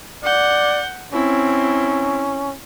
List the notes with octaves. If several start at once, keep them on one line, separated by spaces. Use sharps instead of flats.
D5 F#5 G6
C4 C#4 E4